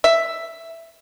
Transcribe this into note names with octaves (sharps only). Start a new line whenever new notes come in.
E5